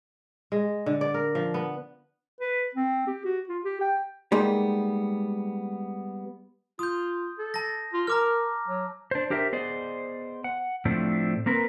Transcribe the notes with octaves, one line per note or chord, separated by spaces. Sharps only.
G#3
D3
D5
A#4
F3
B3
B4
C4
G4
F#4
F4
G4
G5
G3 G#3 A#3 B3 D#4
F4 D#6 G6
A4
A5 A#6
F4
A#4 A#5 D6 F6
F#3
D4 C5
D4 G4 A#4 C5 E5
B3 G#4 C5 D5 D#5
F#5
A2 F3 A3 C4 D4
A#3 C4 A#4 B4